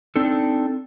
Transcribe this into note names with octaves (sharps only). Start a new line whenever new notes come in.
C4 D4 D#4 A4